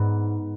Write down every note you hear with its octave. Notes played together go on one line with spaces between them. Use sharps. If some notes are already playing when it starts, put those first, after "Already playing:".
Already playing: G#2 B3